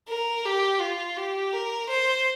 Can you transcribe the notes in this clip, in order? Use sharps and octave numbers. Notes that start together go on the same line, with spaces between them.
A#4
G4
F4
G4
A#4
C5